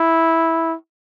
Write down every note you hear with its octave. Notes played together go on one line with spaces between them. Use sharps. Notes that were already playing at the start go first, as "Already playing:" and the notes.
Already playing: E4